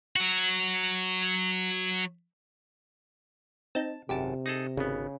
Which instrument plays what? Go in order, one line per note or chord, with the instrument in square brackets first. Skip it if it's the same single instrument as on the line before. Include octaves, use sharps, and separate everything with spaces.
[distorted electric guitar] F#3 F#4
[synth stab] C4 D#4 [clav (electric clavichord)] A5
[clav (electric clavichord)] G#1 F#2 A5 [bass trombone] C3 [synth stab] G4
[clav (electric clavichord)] D#4 G#4 A4 [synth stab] A#6
[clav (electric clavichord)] G#1 B3 [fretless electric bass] C#3